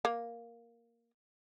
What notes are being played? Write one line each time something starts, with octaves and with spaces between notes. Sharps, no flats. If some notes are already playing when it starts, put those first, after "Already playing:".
A#3